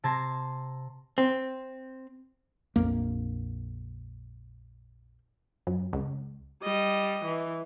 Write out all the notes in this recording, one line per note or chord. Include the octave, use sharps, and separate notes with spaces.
C3 A5 C6 G#6 A#6
C4
A#1 F2 A#3
F#2
C#2
G3 D#5
E3